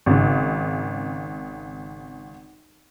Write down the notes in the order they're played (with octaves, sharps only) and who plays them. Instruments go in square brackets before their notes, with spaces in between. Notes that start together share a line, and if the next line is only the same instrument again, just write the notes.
[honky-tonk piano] G#1 C#3